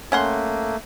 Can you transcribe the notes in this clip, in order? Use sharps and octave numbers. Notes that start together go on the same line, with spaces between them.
A3 A#3 C#4 F#5 C6